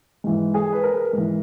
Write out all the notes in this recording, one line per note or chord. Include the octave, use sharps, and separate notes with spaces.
G#2 E3
G#4
B4
A#4
G#2 E3